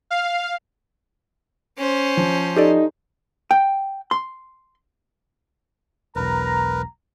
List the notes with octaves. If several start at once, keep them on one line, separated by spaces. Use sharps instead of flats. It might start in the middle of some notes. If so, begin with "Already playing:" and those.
F5
C#4 C5
F3
D#4 G4 A4 D5
G5
C6
E1 B1 A#4 B4 A#5